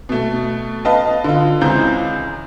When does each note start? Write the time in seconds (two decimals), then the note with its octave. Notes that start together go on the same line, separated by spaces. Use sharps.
0.09 B2 A3
0.85 B4 D#5 F5 A5
1.24 D3 F4
1.61 C#2 E3 C4 A#5 G6